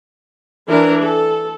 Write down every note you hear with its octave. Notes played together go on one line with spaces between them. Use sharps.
E3 D4 A#4
A4